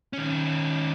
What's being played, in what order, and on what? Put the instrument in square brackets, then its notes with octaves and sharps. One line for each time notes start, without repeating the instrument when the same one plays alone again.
[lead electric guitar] D#3 C#4